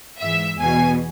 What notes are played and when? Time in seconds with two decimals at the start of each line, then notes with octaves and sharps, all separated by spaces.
0.19 G#2 E3 E5
0.58 E2 B2 G#5